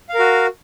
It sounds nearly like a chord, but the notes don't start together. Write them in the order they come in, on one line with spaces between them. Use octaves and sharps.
F5 A#4 F#4